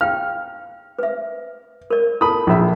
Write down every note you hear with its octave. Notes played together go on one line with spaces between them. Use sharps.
F5 G5 F6
B4 E5
A#4 D5
E4 A4 A5 B5 D#6
A#1 E4 E5